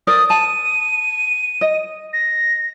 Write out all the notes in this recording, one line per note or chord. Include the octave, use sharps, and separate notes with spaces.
A#4 C5 D5 D#6
A5 D#7
D#5
A#6